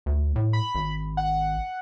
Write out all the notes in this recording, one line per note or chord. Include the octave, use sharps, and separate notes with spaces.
D2
A2
B5
G#1
F#5